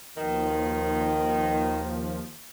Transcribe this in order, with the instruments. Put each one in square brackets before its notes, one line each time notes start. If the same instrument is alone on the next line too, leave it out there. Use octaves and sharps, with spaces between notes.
[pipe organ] D#2 F3 [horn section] B2 D#3